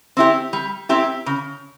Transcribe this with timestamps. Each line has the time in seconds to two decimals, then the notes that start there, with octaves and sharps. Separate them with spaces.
0.17 C4 E4 G4
0.53 G3
0.89 C4 E4 G4
1.26 C#3